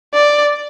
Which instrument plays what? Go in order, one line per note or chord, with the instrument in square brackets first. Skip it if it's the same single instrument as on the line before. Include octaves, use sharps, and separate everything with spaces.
[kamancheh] D5